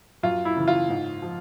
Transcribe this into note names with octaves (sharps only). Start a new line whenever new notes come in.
F#2 F4
E4
C#3 E3
F4
G#2
F3